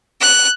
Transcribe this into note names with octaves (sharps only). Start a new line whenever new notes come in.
F#6